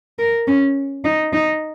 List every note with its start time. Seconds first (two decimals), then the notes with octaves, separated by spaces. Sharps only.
0.19 A#4
0.48 C#4
1.04 D#4
1.33 D#4